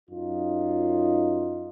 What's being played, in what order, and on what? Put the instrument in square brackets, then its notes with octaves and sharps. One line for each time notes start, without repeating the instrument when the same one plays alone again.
[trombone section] F#2 D#4 F4